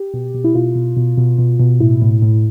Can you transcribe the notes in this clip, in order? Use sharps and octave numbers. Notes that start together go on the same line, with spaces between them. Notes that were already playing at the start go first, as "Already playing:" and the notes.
Already playing: G4
B2
B2
E4
B2 F4
B2
B2
B2
B2
B2
A2 E4
A2
A2